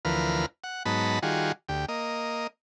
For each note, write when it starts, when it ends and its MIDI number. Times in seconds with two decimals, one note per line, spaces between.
0.05 0.46 38
0.05 0.46 52
0.05 0.46 53
0.05 0.46 70
0.05 0.46 71
0.05 0.46 89
0.64 0.83 78
0.85 1.19 44
0.85 1.19 54
0.85 1.19 59
0.85 1.19 63
0.85 1.19 81
0.85 1.19 83
1.23 1.52 51
1.23 1.52 55
1.23 1.52 65
1.23 1.52 66
1.23 1.52 68
1.69 1.86 38
1.69 1.86 67
1.89 2.47 58
1.89 2.47 75